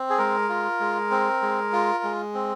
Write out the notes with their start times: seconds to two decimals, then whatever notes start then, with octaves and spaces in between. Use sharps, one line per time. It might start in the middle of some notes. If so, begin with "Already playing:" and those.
Already playing: C4
0.10 G#4
0.18 G#3 A#4
0.49 F4
0.80 G#3
1.11 C4
1.42 G#3
1.73 F4
2.03 G#3
2.34 C4